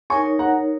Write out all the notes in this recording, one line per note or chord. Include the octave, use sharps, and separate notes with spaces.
D#4 A#4 C#5 G#5 C#6
F#5 A#5